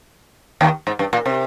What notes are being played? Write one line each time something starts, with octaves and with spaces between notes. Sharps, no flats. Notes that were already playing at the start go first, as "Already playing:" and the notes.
D#2 D#3
G#2
G2
A#2
C3